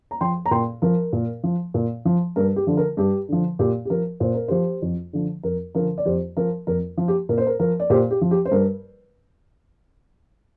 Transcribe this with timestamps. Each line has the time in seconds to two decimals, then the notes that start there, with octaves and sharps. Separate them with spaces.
0.11 A#5
0.21 F3 G5 C6
0.46 A#5
0.51 A#2 G5 C6
0.82 F3 A#4
1.13 A#2
1.44 F3
1.74 A#2
2.05 F3
2.36 G2 A#4
2.56 G4
2.67 D3 F3
2.77 A#4
2.97 G2 G4
3.29 D3 F3
3.59 A#2 G4
3.85 G4
3.90 F3 A#4
4.20 A#2 C5
4.35 A#4
4.48 F3 G4 C5
4.82 F2
5.13 D3 F3
5.43 F2 A#4
5.75 D3 F3 A#4
5.98 D5
6.06 F2 G4 C5
6.37 F3 A#4
6.67 F2 A#4
6.98 F3
7.08 G4
7.29 A#2 A#4
7.38 C5
7.47 A#4
7.60 F3 A#4
7.80 D5
7.90 A#2 G4 C5
8.11 G4
8.21 F3
8.31 G4
8.45 C5
8.51 G2 A#4